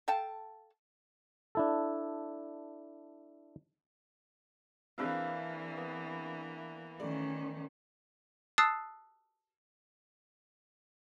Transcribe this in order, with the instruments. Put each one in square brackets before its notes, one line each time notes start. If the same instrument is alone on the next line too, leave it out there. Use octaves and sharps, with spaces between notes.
[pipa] A4 F5 G5 A5
[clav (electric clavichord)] D4 E4 A4
[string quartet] E3 A#3 [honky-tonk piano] C4 D4 G#4 [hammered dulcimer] B4 E5 F5
[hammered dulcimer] B3
[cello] D#3 C#4 [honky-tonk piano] A3 D5
[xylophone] A5 D#6 E6 F#6 A6 C7